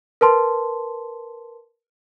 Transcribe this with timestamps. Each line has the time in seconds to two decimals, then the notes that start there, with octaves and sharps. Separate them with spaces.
0.21 A#4 B4 A5 C6